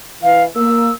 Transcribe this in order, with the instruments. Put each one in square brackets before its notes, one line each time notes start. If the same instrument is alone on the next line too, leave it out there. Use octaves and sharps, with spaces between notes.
[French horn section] E3 [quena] F5
[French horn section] A#3 [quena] E6